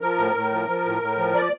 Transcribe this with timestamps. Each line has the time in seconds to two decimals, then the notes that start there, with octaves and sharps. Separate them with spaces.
0.01 F3 A#4
0.18 A2
0.35 A2
0.52 F3
0.68 F3
0.85 A2
1.02 A2
1.17 F3
1.35 D5